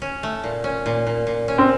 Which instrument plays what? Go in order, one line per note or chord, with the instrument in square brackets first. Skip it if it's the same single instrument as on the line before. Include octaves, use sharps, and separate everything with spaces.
[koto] C#4
A3
A#2
C#4
A#2
A#2
A#2
C#4
[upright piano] C4